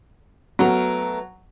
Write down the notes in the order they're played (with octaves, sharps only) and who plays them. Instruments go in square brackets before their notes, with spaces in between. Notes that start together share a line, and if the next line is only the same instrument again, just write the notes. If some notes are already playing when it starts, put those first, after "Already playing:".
[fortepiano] F#3 [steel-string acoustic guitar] A3 B3 A#4